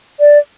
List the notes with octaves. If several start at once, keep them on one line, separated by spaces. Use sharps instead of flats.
D5